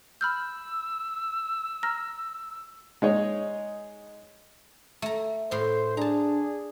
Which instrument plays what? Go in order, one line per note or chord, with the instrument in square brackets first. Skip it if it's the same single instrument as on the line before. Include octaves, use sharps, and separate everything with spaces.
[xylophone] B5 F6 G6 [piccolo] E6
[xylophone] A#5 F6 A#6
[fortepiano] G#3 D#4 C#5
[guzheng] A3 A#5
[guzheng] A2 C6 [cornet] C5
[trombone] D4 [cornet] G#4 [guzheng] A5 A#5